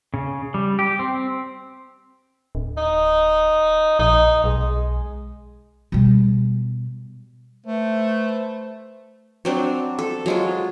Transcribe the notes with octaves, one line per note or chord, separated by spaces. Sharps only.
C#3
G3
G4
C4
D1
D#4
A#1 D#4
B1 G#3
B2 G3
A3 B4 C5
F#3 C4 D4
A4
F#3 G#3 F4